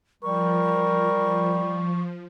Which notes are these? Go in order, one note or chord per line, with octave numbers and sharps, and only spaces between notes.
F3 G3 A#4 C#6